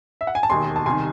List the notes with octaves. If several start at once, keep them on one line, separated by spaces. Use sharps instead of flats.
E5
F#5
G#5
A5
E1 D#2 D#3 G#5 C6
A5
C2 C3 D#3 G#5 C6